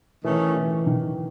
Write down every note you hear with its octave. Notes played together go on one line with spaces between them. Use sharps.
D#3 E3 A3 C#4
E3
D#3